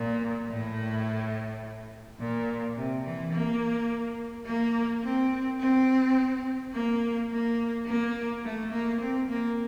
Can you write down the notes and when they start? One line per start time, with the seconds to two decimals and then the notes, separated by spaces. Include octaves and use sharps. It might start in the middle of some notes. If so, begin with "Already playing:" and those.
Already playing: A#2
0.49 A2
2.19 A#2
2.76 C3
3.04 E3
3.33 A#3
4.46 A#3
5.03 C4
5.59 C4
6.73 A#3
7.30 A#3
7.86 A#3
8.44 A3
8.71 A#3
9.00 C4
9.28 A#3